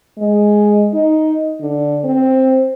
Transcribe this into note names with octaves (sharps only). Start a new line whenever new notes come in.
G#3
D#4
D3
C4